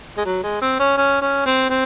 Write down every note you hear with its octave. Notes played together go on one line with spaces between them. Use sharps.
G#3
F#3
G#3
C4
C#4
C#4
C#4
C4
C4